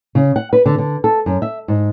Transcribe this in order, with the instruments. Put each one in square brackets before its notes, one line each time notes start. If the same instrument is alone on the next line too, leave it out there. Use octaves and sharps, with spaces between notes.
[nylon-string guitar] C#3
F#5
B4
D3
D3
A4
F#2
E5
G#2